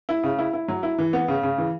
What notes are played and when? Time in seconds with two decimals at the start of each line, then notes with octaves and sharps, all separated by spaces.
0.09 E4
0.23 C#3
0.39 E4
0.53 E4
0.68 F#3
0.83 E4
0.98 E3
1.13 B3
1.28 C#3
1.43 C#3
1.58 E3